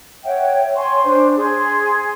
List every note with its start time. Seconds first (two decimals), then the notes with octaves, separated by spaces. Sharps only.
0.24 C#5 E5 F#5 G5
0.76 C#5 G#5 C6 C#6
1.04 D4 C5
1.36 G#4 C6